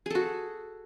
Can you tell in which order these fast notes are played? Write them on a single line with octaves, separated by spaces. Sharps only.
G#4 A4 F#4